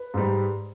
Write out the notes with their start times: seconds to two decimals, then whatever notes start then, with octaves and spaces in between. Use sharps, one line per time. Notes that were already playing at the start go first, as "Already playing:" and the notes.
Already playing: B4
0.14 G#2 G3